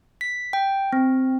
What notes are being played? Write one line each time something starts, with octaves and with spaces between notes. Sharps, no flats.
B6
G5
C4